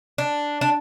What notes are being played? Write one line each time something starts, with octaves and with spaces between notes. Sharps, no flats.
D4
D4